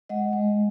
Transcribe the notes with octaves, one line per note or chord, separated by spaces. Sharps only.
G#3 D#5 F#5
G#3